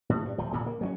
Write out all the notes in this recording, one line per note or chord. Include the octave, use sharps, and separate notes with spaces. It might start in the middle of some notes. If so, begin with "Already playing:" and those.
A2
G2
D1 F3
C2 A#2 C#3 F3
A#3
F#3 A#3 C#4